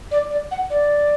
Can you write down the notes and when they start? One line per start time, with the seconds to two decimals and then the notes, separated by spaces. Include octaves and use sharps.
0.11 D5
0.30 D5
0.51 F#5
0.70 D5